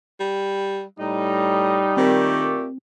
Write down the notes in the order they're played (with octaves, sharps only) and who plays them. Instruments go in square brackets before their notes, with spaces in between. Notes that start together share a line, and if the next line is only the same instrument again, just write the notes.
[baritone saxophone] G3
[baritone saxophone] A2 [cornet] G3 [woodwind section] D#4
[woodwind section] A#2 A3 G4 [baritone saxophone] D#3 [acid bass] C4